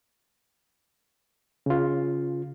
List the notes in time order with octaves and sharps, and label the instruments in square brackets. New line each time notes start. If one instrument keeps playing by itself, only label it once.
[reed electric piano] C#3 F4